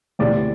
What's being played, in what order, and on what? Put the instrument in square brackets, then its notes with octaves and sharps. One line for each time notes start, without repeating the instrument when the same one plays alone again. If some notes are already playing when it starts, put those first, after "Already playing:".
[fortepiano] D2 C3 E3 D5